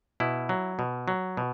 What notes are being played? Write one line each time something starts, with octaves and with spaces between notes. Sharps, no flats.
B2 E4
F#3
B2
F#3
B2